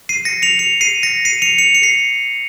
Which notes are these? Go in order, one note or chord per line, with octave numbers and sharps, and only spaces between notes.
C7 D#7
A#6 C#7
C#7 F7
C#7 F7
C7 D#7
A#6 C#7
C7 D#7
C#7 F7
C#7 F7
C#7 F7
C7